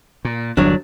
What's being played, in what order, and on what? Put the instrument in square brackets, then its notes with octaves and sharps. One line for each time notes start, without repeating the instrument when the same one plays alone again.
[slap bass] A#2
[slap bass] G1 E2 [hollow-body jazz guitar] F#3 D4